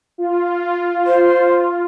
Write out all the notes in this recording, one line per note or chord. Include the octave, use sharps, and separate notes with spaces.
F4
C5